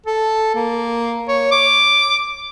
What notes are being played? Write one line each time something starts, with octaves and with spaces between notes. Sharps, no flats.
A4
A#3
C#5
D6